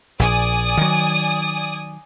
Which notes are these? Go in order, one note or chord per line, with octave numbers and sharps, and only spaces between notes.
A#1 D5 G#5 D#6
D#3 F#3